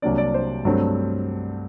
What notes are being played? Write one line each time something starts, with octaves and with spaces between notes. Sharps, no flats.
C2 C3 F#3 A#3 D4 D5
D5
C5
G2 F#3 A3 C4